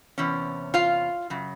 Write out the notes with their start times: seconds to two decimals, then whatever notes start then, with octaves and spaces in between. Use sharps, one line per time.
0.18 E2 C3 C#4
0.74 F4 F5
1.30 F#2 C#3